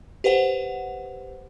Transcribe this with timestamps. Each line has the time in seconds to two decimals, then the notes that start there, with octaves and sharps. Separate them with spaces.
0.24 G4 B4 C5 F#5